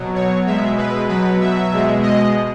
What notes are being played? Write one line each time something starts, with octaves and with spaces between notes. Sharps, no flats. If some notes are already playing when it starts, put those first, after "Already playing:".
Already playing: B2 F#3
C#5
B2 G#3 E5
B4
B2 F#3 B4
E5
B2 G#3
D#5